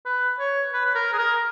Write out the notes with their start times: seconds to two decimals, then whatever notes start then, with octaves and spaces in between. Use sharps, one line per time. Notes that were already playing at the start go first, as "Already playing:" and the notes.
0.05 B4
0.39 C#5
0.73 B4
0.85 B4
0.95 A#4
1.13 G#4
1.18 A#4